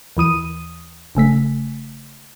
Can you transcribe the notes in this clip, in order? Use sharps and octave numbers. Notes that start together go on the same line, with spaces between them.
D#2 E3 D#6 D#7
G1 C#3 A3 B6